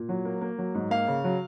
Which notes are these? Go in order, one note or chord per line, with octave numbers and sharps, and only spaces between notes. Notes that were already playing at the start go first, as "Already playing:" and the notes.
Already playing: A#2
F#3
A#3
A#3
F#3
G#2
A#3 F5
C#3
F#3